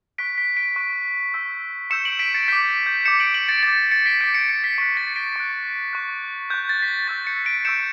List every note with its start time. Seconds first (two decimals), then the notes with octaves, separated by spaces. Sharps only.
0.18 C#6 F#6 B6 D7
0.38 B6
0.56 B6 D7
0.76 C#6 F#6
1.33 C#6 E6 G6
1.90 C#6 E6 G6 C#7 E7
2.05 D7 F#7
2.19 B6 D7
2.34 A6 C#7
2.48 D6 G6 B6
2.86 G6
3.05 D6 G6 C#7 E7
3.20 D7 F#7
3.34 D7 F#7
3.49 A6 C#7
3.63 D6 G6 A6
3.91 A6 C#7
4.06 B6 D7
4.20 G6 B6 D7
4.24 D6
4.35 A6 C#7
4.49 A6 C#7
4.64 B6
4.78 C#6 B6
4.82 F#6
4.97 A6 C#7
5.16 B6 D7
5.36 C#6 F#6
5.93 C#6 F#6
6.50 C#6 F#6 G6
6.69 A6
6.82 B6
6.88 A6
7.08 C#6 E6 G6 A6
7.27 A6 C#7
7.46 B6 D7
7.65 C#6 E6 G6 C#7 E7